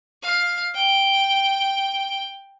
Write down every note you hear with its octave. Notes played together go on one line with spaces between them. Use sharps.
F5
G5